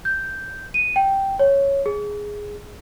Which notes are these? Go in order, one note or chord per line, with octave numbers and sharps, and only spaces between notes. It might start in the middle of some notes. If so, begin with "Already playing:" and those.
G6
D#7
G5
C#5
G#4